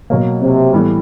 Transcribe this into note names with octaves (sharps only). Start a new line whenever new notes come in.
B2 F#3 A#3
C3
A2 E3 G3 B3